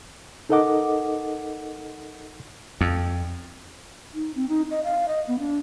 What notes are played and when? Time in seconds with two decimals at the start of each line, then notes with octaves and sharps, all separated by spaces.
0.49 D#4 A4 A#4 D#5 F#5 D6
2.81 F2
4.14 D#4
4.36 C4
4.49 D#4
4.71 D#5
4.84 F5
5.08 D#5
5.28 B3
5.39 D4